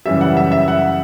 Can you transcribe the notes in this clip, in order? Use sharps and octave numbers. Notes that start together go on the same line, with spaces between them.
F#2 C#3 E3 G3 E5
F#5
E5
E5
F#5